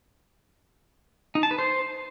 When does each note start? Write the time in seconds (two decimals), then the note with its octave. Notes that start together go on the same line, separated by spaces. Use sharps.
1.35 D#4
1.43 A5
1.51 B4
1.59 C5